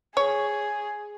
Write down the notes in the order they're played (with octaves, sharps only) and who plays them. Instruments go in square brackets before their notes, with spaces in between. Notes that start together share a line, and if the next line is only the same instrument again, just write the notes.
[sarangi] G#4 [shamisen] C#5